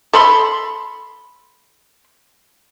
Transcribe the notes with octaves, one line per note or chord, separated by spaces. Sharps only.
A4 B5 C6